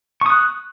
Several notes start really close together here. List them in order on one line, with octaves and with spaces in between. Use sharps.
C#6 D#6 F#6